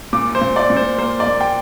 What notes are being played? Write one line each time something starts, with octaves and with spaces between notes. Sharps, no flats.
A#2 D6
C5
A#2
D5
A#2
C5
A#3 C5
D5
A#3
G5